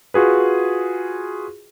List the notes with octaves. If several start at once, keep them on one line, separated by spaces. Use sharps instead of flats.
F4 F#4 G#4 B4